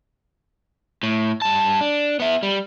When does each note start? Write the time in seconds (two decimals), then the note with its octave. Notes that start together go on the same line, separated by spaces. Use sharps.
1.03 A2
1.42 G2 A5
1.81 D4
2.20 B3 E5
2.43 G3